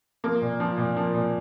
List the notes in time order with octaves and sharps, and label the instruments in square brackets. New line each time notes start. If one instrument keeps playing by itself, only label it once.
[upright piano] F3 A#3
A#2
F3
A#2
F3
A#2